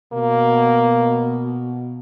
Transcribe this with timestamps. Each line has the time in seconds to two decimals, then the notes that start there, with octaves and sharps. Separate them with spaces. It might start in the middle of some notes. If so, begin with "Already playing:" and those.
0.13 B2 A#3